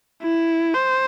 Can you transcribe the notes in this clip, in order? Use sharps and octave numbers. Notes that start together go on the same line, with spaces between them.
E4
C5